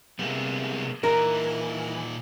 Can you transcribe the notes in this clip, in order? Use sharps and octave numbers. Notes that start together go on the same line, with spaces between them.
C3 G3 G#3 A#3 B3
A#2 E3 D#4 A#4